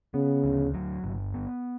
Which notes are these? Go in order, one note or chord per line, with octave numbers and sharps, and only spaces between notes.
C#3 B3
D2
F#3
G1
B3